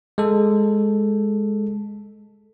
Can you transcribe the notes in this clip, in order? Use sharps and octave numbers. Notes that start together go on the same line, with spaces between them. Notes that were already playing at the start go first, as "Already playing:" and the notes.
G#3 A4